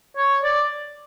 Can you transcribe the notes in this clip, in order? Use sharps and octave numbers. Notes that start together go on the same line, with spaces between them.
C#5
D5